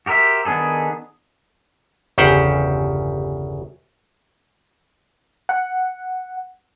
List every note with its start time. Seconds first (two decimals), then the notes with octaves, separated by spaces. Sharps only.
0.06 F#4 G4 A#4 C5 E5
0.45 D#3 B3 D4 G#4 A4
2.18 G1 E2 C#3 G4 C5 F#5
5.49 F#5